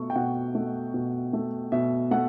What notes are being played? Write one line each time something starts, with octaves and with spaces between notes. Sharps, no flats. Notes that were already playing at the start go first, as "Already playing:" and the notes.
Already playing: B2 A3 C#6
G5
B2 F#5
A3
B2
A3
B2 E5
A3 F#5